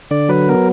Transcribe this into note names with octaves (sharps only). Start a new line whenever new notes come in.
D3 D5
F#3 B4
B3 A#4